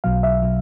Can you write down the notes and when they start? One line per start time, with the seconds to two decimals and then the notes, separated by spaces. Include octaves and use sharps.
0.04 B1 B2 F#3 F5
0.23 E5
0.42 B2 F#3